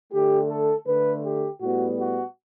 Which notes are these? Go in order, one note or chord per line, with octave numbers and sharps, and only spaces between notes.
D3 A3 G4
A4
D3 A3 B4
G4
A2 G3 B3 F#4
F#4